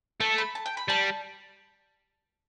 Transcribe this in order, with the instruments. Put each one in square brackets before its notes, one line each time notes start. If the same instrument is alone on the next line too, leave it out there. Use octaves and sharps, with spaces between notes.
[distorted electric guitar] A3 [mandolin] A5
[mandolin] B5
A5
G5
B5
[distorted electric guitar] G3 [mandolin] A5